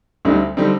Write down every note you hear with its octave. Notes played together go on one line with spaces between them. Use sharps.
D2 D3 G3 C4 D#4
D3 G3 C4 D#4